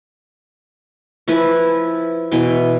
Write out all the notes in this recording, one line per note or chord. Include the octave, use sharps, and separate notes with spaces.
F3 E4 B4 G#5
B2 E3 G#5 C6